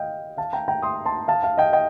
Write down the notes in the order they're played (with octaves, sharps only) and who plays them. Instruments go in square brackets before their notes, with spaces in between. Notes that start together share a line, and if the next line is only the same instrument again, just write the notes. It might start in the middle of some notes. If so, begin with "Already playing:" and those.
Already playing: [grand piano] D#5 F5 G5
F5 A5
G5 A#5
G5 A#5
C6 D#6
A5 C6
F5 A5
F5 A5
D#5 G5
D#5 G5